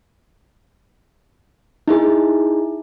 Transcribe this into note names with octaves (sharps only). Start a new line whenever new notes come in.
D#4 E4 G#4